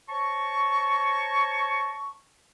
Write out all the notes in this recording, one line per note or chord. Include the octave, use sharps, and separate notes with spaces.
C5 C#5 A5 A#5 C#6